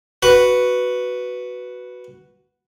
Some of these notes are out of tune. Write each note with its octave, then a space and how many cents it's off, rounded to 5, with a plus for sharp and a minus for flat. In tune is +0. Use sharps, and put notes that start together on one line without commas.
F#4 +0 B4 +0